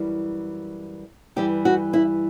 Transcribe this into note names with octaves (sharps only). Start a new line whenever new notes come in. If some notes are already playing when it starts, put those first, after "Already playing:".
Already playing: F#2 E3 G3
G2 E3 G3 G4
F#4
E4